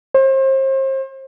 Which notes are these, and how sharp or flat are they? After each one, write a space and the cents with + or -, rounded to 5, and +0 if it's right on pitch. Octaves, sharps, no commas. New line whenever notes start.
C5 +35